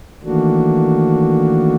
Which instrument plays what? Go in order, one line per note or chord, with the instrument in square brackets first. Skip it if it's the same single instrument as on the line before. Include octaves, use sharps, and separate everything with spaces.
[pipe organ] D#3 E3 A3 A#3 D4 F#4